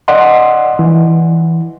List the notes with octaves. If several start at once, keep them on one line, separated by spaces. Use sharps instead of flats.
D5 D#5 F#5 C6
E3